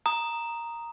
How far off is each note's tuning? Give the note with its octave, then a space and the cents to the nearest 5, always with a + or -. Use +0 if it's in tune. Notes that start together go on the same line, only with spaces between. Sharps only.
A#5 +0 D#6 +0